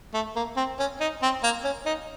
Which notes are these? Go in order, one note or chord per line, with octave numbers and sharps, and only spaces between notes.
A3
A#3
C4
C#4
D#4
C4
A#3
C#4
D#4